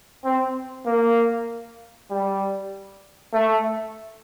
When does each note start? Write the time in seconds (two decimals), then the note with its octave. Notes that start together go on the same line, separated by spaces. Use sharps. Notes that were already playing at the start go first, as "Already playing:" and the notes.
0.24 C4
0.86 A#3
2.10 G3
3.33 A3